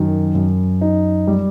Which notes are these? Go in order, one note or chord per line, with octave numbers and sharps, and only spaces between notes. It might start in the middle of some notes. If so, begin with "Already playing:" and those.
Already playing: F#2 D#3
F#2
D#4
G3